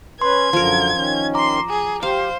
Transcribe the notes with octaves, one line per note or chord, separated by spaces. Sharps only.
C#4 B4 C6 G#6
F#2 D3 F3 A#4
D#3 C#4
A#5 C6 D6
G#4
G4 C5 F5